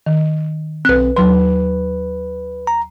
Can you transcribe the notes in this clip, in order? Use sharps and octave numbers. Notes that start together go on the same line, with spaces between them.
D#3
B1 C4 B4 F#6
D#2 F#3 B4 C6
A#5